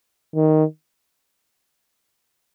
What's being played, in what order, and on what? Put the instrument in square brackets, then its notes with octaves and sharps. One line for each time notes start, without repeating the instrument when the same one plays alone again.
[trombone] D#3